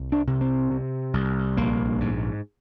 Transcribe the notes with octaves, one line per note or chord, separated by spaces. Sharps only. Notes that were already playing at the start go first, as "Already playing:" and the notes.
Already playing: C2
D4
C3
C4
C3
C2
A#1 A#3
G#2